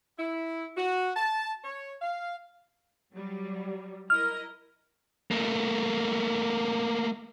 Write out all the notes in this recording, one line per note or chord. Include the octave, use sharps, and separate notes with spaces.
E4
F#4
A5
C#5
F5
F#3 G3
E4 A#4 D#5 F6
A3 A#3